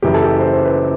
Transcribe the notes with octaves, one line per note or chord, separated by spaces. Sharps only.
F#1 F#2 E3 G4
A4
G4
C5
C5
B4